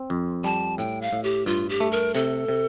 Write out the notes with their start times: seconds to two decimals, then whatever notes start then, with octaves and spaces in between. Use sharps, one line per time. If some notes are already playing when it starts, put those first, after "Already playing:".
Already playing: C4
0.10 F2
0.44 G3 A5
0.78 A2 G5
1.02 F5
1.13 A2
1.24 G4
1.46 G2 F4
1.69 G4
1.80 A3
1.92 A#4
2.15 C3 A4
2.48 C3